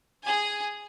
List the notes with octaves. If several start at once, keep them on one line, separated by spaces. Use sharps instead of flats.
G#4 G#5